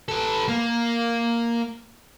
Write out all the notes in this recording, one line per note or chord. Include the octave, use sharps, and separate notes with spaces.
A4 B4
A#3